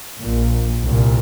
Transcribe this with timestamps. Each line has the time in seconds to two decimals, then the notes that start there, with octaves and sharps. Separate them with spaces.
0.19 A#1 A#2
0.84 C2 A#2